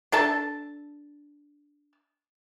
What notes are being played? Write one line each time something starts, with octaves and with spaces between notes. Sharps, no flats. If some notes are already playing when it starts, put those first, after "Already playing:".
D4 A4 A5